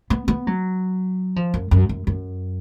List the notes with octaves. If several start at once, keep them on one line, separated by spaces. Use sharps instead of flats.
B3
B3
F#3
F3
F#2
F#2
F#2
F#2